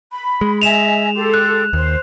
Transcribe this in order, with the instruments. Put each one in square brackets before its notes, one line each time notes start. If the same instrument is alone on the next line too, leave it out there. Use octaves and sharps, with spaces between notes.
[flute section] B5
[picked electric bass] G#3
[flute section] D#5 E5 G#5 [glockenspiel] E7 F7
[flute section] G4 A4 C6
[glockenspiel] F#6
[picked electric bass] D#2 [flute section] C5